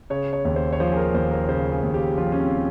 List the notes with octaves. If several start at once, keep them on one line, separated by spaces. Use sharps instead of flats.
C#3 C#5
C#5
D#2 C#5
C5
C#5
F3 C5
G#4
A#4
D#2 C5
A#4
C#3 C5
G#4
D#2
G4
F3 F4
C#4
C4